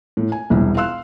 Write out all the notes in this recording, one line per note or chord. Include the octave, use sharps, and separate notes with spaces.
A2
G#5
E1 C2 E4
F5 C6 E6 F#6